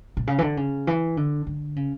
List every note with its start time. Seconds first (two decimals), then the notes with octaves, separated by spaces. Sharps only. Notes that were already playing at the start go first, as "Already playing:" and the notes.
0.17 A#2
0.27 C#3
0.38 E3
0.43 D3
0.57 C#3
0.87 E3
1.17 D3
1.47 D3
1.76 C#3